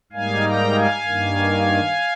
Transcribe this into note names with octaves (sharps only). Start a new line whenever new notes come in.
G#2 G3 A#3 D#4 F5 G#5
G5 A#5
F5 G#5
G2 D#3 A#3